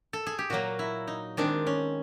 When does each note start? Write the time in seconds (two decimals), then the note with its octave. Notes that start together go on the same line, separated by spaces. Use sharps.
0.13 A4
0.27 G#4
0.39 G4
0.50 A#2 F#3 A#3 F#4
0.79 E4
1.07 D#4
1.37 D#3 G#3 C4 D4
1.67 C#4